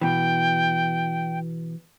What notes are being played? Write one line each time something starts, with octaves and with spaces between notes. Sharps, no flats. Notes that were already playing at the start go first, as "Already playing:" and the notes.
B2 E3 G5